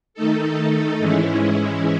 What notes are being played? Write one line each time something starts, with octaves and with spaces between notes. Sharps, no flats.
D#3 A3 D#4 A4
G#2 E3 G#3 C#4 E4